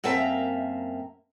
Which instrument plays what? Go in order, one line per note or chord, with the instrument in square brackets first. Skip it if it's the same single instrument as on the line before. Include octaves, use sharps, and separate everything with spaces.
[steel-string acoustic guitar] F#2 A#3 C4 E5 A5 A#5